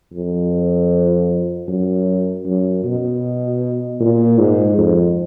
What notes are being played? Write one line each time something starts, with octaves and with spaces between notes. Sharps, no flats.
F2
F#2
F#2
B2
A#2
G#2
F2